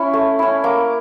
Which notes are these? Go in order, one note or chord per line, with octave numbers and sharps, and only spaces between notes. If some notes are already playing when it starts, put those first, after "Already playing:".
Already playing: C#4 E4 C#6
A3
C#4 E4
A#3 D6